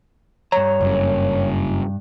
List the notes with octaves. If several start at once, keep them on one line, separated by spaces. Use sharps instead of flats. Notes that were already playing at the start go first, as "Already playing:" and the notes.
G2 C#5 A#5
F#1 F#2